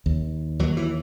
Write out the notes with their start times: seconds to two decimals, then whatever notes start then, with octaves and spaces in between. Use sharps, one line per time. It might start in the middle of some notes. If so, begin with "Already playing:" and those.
0.06 D#2
0.59 D#2 F#3
0.77 E3